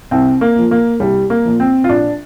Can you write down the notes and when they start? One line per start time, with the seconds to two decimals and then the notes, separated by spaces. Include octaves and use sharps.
0.11 C2 C4
0.41 A#3
0.56 A#2 F3
0.71 A#3
1.00 C2 G3
1.30 A#3
1.45 A#2 F3
1.60 C4
1.84 F4
1.89 A#1 D4